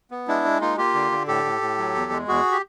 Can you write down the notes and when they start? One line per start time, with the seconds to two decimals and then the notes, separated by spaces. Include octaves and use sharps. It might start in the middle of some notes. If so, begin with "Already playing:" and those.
0.11 B3
0.28 G#3 D4 E4
0.44 G#3
0.61 A#3 D#4 F4
0.78 A#3 F4 G4
0.94 D3
1.12 D3
1.28 A2 G4 A4
1.44 A2
1.61 A2
1.78 F#3
1.95 E2
2.12 G#3
2.28 E2 F#4 G#4
2.52 G4